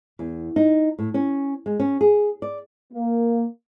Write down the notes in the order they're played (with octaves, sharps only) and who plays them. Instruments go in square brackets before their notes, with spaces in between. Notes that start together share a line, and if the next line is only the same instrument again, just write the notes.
[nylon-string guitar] E2
D#4
A2
C#4
G#3
C#4
G#4
D5
[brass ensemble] A#3